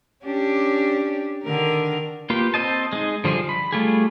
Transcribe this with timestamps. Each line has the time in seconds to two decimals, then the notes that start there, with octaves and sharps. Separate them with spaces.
0.24 C#4 D4 G4
1.44 D3 D#3 A#4
2.30 A#3 F4 G4 B4 G5
2.54 C4 C5 D#5 A5
2.93 G#3 D#4
3.24 D3 F3 G3 G#4
3.49 B5
3.73 G3 A3 F4 G4 G#4